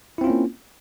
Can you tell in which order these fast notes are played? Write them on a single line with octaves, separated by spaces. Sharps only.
E4 C4 F4 C#4 A#3